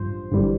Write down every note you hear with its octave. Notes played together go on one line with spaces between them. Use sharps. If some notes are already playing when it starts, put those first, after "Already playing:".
Already playing: A1 G2 F3 C5
G1 G2 E3 G3